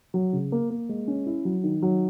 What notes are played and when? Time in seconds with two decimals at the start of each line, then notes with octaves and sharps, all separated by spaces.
0.14 F#3
0.33 C#3
0.52 A#3
0.70 A#3
0.89 G#3
1.08 C#4
1.26 E4
1.45 F#3
1.64 D#3
1.82 F#3